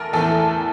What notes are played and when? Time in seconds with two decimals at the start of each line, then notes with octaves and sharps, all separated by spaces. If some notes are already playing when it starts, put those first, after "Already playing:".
Already playing: E2 E3 A4 A#4
0.13 E2 E3 A3 A4